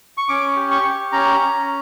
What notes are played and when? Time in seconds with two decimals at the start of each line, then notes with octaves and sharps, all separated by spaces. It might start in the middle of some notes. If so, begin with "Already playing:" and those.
0.17 C#6
0.29 C#4 D6
0.56 G4
0.71 C#6
0.84 G4
1.12 C#4 A#5
1.40 C#4